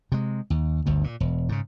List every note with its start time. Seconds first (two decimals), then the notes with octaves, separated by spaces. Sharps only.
0.12 C3 G#3
0.50 D#2
0.86 G1 D2 G2
1.04 A#2
1.20 E1
1.49 G#2 C#3